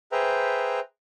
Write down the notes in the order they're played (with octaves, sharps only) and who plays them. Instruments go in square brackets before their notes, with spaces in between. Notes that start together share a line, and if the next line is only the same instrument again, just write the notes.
[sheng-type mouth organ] G#4 B4 C5 E5 G5 A#5